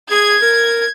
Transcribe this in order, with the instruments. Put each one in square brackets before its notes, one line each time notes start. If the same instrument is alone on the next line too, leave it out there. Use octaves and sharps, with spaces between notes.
[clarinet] G#4 [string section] G#6
[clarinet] A#4